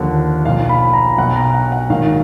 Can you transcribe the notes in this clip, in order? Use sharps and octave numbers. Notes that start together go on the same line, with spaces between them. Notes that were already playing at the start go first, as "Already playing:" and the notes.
Already playing: D#2 D3 F3
B1 A#2 F3 F5
B5
A#5
B1 B2 F#3 F#5
A#5
F#5
F#5
A#1 G#2 D#3 F#3 F5